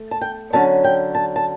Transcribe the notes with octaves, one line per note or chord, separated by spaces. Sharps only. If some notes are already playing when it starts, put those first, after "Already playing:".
Already playing: A3
A5
G5
D3 F#3 C#4 A5
G5
A5
A5